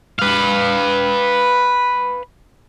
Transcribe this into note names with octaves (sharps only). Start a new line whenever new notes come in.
B4 F5